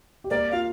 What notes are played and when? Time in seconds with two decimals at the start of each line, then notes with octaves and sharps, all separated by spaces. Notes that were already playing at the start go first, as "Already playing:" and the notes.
0.24 G4
0.30 A#3 A#4 D5
0.51 F4 F5